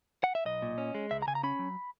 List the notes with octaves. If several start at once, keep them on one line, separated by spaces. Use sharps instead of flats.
F#5
E5
B1 D#5
A#2
C#4
G#3
C#2 E5
A#5
C#3 G#5
A#5
C#4 B5
F#3